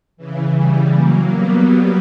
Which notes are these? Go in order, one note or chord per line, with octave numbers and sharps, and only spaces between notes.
C#3 E3
E3 G3
F#3 A#3
G3 B3